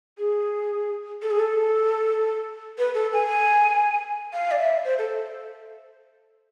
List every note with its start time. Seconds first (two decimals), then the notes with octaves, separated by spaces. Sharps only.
0.18 G#4
1.22 A4
1.31 G#4
1.39 A4
2.78 B4
2.94 A4
3.13 G#5
4.33 F5
4.51 D5
4.59 E5
4.85 C5
4.98 A4